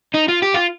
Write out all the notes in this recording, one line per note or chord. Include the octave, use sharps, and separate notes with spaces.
D#4
F4
G4
F4